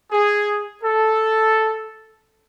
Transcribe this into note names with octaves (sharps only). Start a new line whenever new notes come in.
G#4
A4